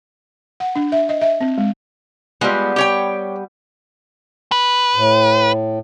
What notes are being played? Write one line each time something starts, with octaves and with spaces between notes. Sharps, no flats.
F#5
D4
E5
D#5
E5
C4
G#3
G3 G#3 B3 F4
G4 C#5 G5
B4
A2